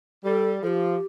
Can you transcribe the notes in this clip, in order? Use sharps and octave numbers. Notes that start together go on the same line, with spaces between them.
G3 A4
F3 G4 A4